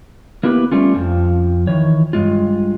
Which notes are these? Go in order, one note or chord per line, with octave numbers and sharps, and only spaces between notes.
A#3 B3 E4 G4 A#4 B4
G3 A3 C#4 F4
F2 F3
D#3 E3 C#5
G2 G#3 F4